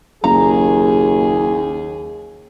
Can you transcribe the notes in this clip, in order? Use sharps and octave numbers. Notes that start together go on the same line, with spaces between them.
F#1 D#2 G#4 A#5